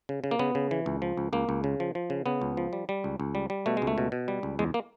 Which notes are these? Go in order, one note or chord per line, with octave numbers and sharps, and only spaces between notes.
C#3
C#3
A#3
C#3 B3
C#3
E3
C#2
F3
C#2
C#2 A#3
C#2
C#3
F3
F3
C#3
C#3 B3
C#2
F3
G3
G3
C#2
C#2
G3
G3
B2 A3
G#3
C#2
A3
B2
B2
G3
C#2
E2 G#3
A#3